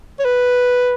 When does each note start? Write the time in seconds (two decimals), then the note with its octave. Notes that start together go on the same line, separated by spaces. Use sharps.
0.19 C#5
0.25 B4